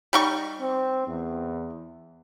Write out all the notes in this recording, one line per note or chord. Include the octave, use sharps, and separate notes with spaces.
G3 D#4 C#6
C4
E2